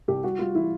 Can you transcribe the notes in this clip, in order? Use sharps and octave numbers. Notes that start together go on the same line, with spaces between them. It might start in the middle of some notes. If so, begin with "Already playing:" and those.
C2 G4
G3 F#4
G3 F4
E3 E4